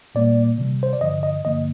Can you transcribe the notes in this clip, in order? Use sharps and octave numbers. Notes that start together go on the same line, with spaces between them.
A#2 G3 A#3 D5
C3 D#3 G3
C5
D5
G2 D3 F3 D#5
D#5
G2 D3 F3 A#3 D#5